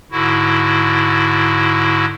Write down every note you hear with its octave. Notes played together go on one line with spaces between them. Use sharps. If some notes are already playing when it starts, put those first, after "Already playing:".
G#2 D3 E4 F#4